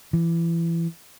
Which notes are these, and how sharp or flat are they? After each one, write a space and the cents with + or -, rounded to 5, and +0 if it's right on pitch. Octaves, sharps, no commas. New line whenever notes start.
E3 +25